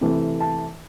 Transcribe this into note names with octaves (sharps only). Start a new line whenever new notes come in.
C3 E3 A3
A5